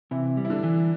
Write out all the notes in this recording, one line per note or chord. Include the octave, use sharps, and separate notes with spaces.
C3 E3 E4
G3
E4
D3 D4
E3